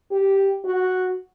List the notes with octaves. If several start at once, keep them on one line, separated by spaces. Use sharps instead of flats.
G4
F#4